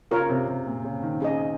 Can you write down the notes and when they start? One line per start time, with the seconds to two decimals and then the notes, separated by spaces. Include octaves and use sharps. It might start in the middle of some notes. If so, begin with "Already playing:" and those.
0.11 C#3 F4 A#4 C#5
0.29 C3
0.48 C3
0.66 A#2
0.84 C#3
1.03 D#3
1.20 C#4 G#4 D#5